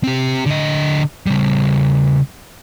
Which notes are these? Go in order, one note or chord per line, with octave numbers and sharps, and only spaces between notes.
C4 G4
D3 D#5
C#3 G3